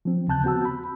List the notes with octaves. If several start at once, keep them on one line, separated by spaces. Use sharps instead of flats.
F3 C4
D#2 C#3 A5 F#6 G6
B3 C4 F#4 A5 E6
B5